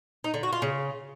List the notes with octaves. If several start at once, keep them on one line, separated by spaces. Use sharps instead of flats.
D#4
D3
F#4
F4
C#3